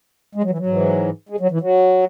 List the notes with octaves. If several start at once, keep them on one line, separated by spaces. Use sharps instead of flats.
G#3
F#3
E3
F#3
G#2 E3
G#3
F#3
E3
F#3